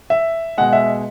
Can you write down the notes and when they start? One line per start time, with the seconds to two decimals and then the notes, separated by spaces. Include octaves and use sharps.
0.10 E5
0.58 B2 G#3 F#5
0.73 E5